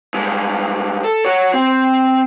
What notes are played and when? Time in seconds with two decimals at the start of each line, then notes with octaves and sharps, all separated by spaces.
0.14 G2 G#3
1.04 A4
1.25 F#4 C#5
1.53 C4